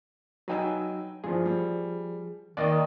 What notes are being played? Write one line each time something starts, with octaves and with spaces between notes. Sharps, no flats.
F#3 D#4 B4 G5 G#5 E6
G2 E3 F3 F4 G#4
G3
D#2 D#3 D5 D#5